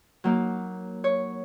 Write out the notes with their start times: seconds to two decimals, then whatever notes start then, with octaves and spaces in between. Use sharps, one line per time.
0.24 F#3 A#3 D#4
1.04 C#5